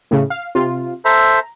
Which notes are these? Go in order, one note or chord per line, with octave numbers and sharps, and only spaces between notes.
A2 C#3
F5
C3 F4
A4 C5 E5 A#5